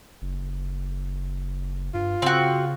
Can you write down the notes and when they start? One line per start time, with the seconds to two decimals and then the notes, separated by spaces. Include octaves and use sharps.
0.22 F#1
1.94 G2 F4
2.22 C#3 C4 F#4